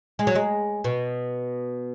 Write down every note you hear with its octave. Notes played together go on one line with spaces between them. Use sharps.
G#3
F#3
G#3
B2